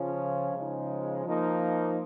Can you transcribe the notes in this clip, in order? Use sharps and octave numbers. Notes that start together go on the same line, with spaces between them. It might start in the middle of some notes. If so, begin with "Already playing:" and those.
Already playing: C#3 F3 C#4 F4
C#3 F3 G#3 D#4
F3 A#3 D#4